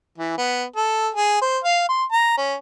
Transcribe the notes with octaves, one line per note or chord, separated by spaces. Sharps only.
E3
B3
A4
G#4
C5
F5
C6
A#5
C#4